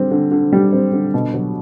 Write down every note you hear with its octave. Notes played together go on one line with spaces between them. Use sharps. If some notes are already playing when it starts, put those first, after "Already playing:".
Already playing: D3 G3 C4
D3
D3
G3
C4
D3
B2
F#3